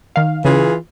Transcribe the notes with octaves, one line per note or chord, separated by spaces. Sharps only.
D#3 F5
C#3 E3 F4 G#4